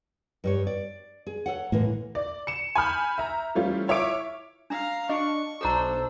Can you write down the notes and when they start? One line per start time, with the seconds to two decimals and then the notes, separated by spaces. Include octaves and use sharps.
0.44 G2 G3 C#5
0.67 D5
1.27 G#4
1.46 A4 C#5 F#5
1.72 A2 D3 E3 A#3
2.15 D5
2.47 C#7 E7
2.75 G#5 B5 F6 G6
3.18 E5 A#5
3.55 E3 F3 G3 A3 C#4 F4
3.88 E4 F4 C#5 E5 D6 D7
4.70 D4 F5 A#5
5.09 D4 D#5 C#6
5.61 B1 D4 A4 C5 A#5 E6